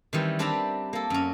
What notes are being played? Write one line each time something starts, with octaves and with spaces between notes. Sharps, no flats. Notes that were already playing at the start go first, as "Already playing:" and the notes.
D#3 E3 G3 C4
C4 D4 B4 D5 E5 A#5
A#3 A4
F#2 C#4